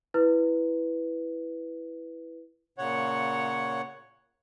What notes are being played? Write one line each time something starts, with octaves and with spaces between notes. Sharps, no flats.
E4 B4
A#2 C#3 C#5 F#5